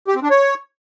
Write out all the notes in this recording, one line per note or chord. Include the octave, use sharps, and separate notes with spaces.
G4
C4
D4
C#5